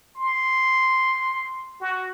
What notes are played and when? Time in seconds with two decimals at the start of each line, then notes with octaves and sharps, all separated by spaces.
0.16 C6
1.81 F#4